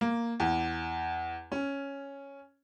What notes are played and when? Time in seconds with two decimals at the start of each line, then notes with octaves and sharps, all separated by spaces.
0.01 A#3
0.40 E2
1.52 C#4